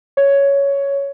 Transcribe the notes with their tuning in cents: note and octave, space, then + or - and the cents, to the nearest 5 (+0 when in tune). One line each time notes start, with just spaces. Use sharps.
C#5 +10